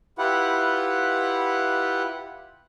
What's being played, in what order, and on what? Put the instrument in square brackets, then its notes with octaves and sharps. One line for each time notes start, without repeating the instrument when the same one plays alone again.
[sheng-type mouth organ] E4 F4 G4 B4 F#5